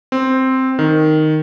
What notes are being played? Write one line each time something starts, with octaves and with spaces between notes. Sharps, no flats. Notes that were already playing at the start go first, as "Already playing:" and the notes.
C4
D#3